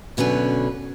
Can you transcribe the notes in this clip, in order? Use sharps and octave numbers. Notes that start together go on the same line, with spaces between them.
F#2 B2 D3 C#4 B4